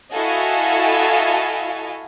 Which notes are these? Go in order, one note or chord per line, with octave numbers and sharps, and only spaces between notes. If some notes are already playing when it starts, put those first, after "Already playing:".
E4 F#4 A4 D#5 F5 G#5